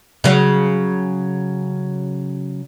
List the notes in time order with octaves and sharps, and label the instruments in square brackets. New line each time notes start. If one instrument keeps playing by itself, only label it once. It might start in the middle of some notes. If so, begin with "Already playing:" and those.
[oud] C#3 F#3